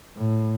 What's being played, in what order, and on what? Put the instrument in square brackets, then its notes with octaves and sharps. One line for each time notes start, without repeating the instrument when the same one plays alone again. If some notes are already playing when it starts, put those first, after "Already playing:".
[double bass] A2